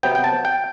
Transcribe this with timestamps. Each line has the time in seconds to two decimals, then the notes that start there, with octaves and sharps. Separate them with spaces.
0.03 C3 F#3 B3 G5
0.15 G5
0.24 A5
0.45 G5